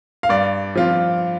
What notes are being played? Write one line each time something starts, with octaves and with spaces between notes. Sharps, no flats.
F5
G2 D5
F3 C4 F4